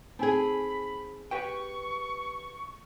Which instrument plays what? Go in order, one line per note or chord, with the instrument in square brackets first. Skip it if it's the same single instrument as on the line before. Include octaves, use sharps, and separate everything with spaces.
[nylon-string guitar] C4 G#4 [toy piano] D#4 G#5 A5 [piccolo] B5
[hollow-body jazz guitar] G4 B4 G5 [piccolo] C#6